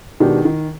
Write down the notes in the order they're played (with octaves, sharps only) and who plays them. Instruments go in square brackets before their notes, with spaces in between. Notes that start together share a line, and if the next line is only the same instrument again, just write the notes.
[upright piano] B2 G#3 D4 G4 [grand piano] D#3
[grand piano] D#3